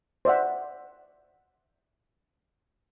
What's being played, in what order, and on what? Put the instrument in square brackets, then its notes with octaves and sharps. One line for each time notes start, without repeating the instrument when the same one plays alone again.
[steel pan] C5 D5 E5 F#5